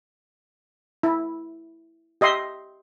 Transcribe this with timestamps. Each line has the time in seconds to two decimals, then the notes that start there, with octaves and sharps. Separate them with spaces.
1.03 E4
2.21 G4 D#5 E5 C6